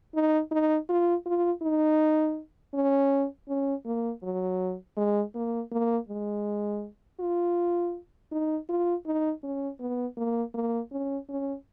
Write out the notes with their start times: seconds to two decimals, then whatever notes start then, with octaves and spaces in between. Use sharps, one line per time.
0.15 D#4
0.52 D#4
0.89 F4
1.26 F4
1.63 D#4
2.74 C#4
3.49 C#4
3.86 A#3
4.23 F#3
4.97 G#3
5.35 A#3
5.72 A#3
6.09 G#3
7.20 F4
8.32 D#4
8.69 F4
9.06 D#4
9.44 C#4
9.80 B3
10.18 A#3
10.55 A#3
10.92 C#4
11.30 C#4